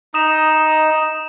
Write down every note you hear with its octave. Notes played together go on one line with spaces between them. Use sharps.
D#4 D#5 D#6 E7